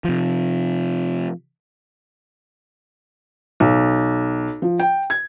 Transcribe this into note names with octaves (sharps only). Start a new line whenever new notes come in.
C3 F3
B1
F3
G5
G#6